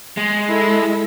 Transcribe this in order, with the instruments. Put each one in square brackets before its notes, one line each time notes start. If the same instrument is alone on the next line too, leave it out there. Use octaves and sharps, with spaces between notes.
[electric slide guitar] G#3
[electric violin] E4 A4